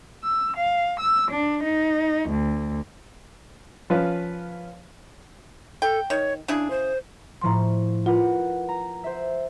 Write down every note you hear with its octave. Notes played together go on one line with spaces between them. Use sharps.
E6
F5
E6
D4
D#4
D2
F3 C#4 B4 F5
A4 G5
D#3 C#5
C#3 D4 E4 G#4
C5
A2 F3 A#5 C6 C#6
F4 A#4 B4 F#5
A#5
C5 E5